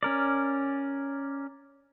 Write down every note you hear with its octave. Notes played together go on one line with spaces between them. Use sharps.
C#4 A#4 D5